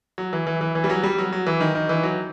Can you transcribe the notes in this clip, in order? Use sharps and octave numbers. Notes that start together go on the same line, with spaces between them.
F#3
E3
E3
E3
E3
G3
F#3
G3
F#3
F#3
E3
D#3
D#3
E3
F#3